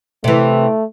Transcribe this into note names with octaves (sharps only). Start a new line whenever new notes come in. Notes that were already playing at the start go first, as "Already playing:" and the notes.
C3 E3 A3